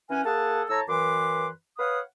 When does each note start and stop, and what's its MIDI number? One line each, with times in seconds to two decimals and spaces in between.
0.10 0.22 52
0.10 0.22 61
0.10 0.22 70
0.10 0.22 78
0.10 0.22 80
0.25 0.63 58
0.25 0.63 68
0.25 0.63 69
0.25 0.63 78
0.25 0.63 81
0.69 0.81 45
0.69 0.81 73
0.69 0.81 81
0.69 0.81 82
0.69 0.81 88
0.88 1.47 42
0.88 1.47 52
0.88 1.47 71
0.88 1.47 84
0.88 1.47 86
1.78 2.00 71
1.78 2.00 73
1.78 2.00 77
1.78 2.00 78
1.78 2.00 87